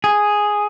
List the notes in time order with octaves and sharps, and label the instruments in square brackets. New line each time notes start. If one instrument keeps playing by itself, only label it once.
[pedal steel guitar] G#4